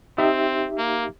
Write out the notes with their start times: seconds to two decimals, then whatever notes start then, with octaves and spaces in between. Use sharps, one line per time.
0.18 C4 D#4 G4 E5
0.78 A#3